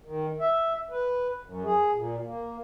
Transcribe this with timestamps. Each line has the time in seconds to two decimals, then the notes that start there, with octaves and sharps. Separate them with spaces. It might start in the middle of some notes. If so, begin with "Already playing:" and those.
0.02 D#3
0.40 E5
0.90 B4
1.43 F#2
1.64 G#4
1.94 A#2
2.24 A#3